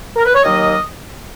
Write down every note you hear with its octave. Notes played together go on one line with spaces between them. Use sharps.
A#4
B4
C#5
D#2 D#3 F#3 A#3 D#5